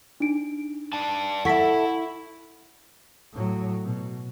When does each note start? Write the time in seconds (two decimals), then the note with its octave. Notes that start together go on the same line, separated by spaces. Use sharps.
0.20 D4 D#4 D7
0.93 D5 G5 A5
1.45 E4 A4 E5 F#5 C#6 B6
3.32 A2 F#3
3.84 B2